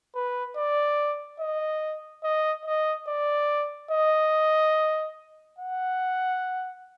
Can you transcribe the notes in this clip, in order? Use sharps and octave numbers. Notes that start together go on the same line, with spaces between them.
B4
D5
D#5
D#5
D#5
D5
D#5
F#5